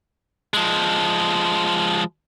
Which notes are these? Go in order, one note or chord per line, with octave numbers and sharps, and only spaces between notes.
F3 G#3